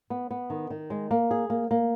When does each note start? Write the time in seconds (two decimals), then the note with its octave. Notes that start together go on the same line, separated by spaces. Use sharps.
0.10 B3
0.31 B3
0.50 D#3
0.70 D#3
0.90 G#3
1.11 A#3
1.31 G#4
1.50 A#3
1.71 A#3